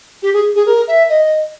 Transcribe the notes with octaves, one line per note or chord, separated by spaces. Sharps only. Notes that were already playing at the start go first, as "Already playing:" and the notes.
G4
G#4
G#4
A#4
E5
D#5